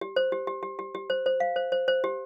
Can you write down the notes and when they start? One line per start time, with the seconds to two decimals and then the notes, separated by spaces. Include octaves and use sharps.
0.01 G4
0.16 C5
0.32 G4
0.47 G4
0.63 G4
0.79 G4
0.95 G4
1.10 C5
1.26 C5
1.40 F5
1.56 C5
1.72 C5
1.88 C5
2.04 G4